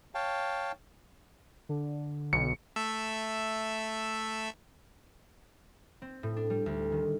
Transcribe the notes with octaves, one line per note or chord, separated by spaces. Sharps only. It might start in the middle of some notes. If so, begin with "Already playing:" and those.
C#5 F5 G5 A5
D3
B1 C#7
A3 A4 E5
C4
A2
D4
G3
D2
D#3